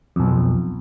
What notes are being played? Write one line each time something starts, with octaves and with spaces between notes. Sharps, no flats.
B1 F2